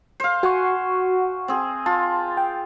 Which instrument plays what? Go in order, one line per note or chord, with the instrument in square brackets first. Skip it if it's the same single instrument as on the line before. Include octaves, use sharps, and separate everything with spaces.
[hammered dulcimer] C5 F5
[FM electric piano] F#4 F#5 C#6 [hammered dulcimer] G#5
[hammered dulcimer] C4 G#4
[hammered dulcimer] F4 [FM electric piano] A5
[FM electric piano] G5